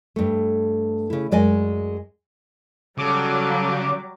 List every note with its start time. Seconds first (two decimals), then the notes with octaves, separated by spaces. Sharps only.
0.16 G2 A3
1.10 C#3 E4
1.31 F#2 G#3 D5 D#5 G#5
2.98 C#3 F#3 G3 A4 D6